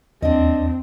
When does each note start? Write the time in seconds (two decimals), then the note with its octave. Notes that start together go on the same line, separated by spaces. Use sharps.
0.22 D#2 C4 D4 D#5